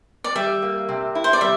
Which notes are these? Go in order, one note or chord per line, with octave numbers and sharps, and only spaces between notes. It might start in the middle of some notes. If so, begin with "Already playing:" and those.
D5
G3 E5
A#3
C3
E4
C5
D5
G3 E5